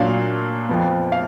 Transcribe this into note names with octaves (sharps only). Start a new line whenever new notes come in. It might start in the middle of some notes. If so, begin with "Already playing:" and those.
Already playing: A#2 F#3 D4 F4 F5
F2 F3 B3
F5